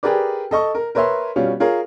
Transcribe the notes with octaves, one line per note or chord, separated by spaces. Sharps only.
G4 G#4 A#4 B4 D5
A4 D#5 C#6
A#4
A#4 B4 C#5 E5 C6
B2 G3 C#4 F4
F4 G#4 A#4 C#5